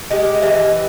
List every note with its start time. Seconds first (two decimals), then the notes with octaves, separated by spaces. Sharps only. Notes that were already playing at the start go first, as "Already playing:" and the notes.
0.10 G#3 G4
0.43 E3